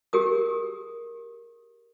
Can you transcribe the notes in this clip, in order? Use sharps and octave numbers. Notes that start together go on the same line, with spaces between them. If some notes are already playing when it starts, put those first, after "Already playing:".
G4 G#4 A#4 D#6